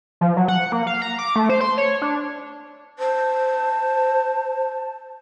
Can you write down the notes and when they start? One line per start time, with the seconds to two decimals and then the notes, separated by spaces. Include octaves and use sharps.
0.21 F3
0.37 F#3
0.48 F#5
0.72 A#3
0.87 F5
1.02 A#5
1.19 D6
1.36 A3
1.49 C5
1.61 C6
1.78 C#5
2.02 D4
2.99 C5 A5